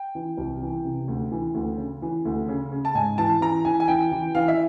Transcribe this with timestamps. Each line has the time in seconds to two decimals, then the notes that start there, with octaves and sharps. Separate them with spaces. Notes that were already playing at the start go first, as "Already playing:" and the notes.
Already playing: G5
0.15 E3
0.38 C2
0.62 E3
0.84 C3
1.08 D2
1.32 E3
1.54 D2
1.78 C#3
2.02 E3
2.25 D2
2.49 C#3
2.72 C#3
2.85 A5
2.95 G#2 G#5
3.18 E3 A5
3.41 E3 A#5
3.65 E3 G#5
3.80 G#5
3.88 E3 G5
4.12 E3
4.35 E3 F5
4.48 E5